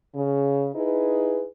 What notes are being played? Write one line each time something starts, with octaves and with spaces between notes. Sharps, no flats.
C#3
D#4 E4 G#4 B4